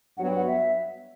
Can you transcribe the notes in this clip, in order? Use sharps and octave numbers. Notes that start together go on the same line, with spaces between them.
G2 F#3 B3 F#4 F#5
G5
F#5
E5